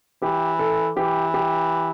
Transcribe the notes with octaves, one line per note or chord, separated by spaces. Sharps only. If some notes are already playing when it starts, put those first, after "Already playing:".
E3 G4
A4
E3 G4
G4